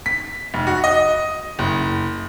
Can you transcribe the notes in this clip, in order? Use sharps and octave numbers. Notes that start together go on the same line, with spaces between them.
B6
F1
F#4
D#5
F#1